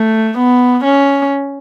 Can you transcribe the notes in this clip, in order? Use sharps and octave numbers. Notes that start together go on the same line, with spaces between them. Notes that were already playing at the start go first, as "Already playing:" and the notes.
Already playing: A3
B3
C#4